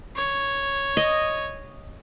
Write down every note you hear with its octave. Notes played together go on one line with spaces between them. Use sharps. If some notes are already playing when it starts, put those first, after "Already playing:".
C#5
D#5